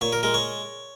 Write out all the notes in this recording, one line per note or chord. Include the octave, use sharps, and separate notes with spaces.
A#2 C#5
A#4
G#3 A#4
C#5